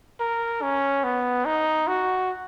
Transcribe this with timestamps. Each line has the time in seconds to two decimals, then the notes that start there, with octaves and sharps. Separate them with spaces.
0.20 A#4
0.62 C#4
1.04 B3
1.45 D#4
1.88 F#4